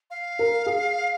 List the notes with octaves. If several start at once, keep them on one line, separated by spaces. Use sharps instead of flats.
F5
A#4
G#4